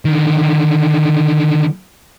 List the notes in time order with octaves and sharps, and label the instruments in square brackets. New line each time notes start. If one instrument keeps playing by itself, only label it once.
[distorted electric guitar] D3 D#3